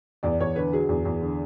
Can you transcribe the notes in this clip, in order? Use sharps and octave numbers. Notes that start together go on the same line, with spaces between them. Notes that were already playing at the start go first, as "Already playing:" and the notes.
E2 D5
E2 C#5
D3 B4
F#3 G#4
E2
E2
D3